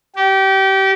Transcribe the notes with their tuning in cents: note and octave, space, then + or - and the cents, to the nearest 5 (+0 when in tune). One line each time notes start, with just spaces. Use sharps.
G4 -25